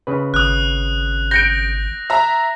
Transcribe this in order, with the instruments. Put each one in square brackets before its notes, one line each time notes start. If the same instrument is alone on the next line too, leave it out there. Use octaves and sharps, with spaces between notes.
[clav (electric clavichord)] C#3 B4
[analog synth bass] G#1 [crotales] D#6 F#6
[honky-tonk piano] G6 C#7 D7 [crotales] A#6
[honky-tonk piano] E5 A#5